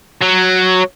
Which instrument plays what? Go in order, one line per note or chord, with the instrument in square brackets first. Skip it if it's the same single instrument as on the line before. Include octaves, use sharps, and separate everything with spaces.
[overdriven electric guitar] F#3